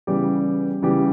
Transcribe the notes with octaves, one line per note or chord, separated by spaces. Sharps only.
C#3 E3 G3 B3 G4
C#3 E3 G3 B3 G4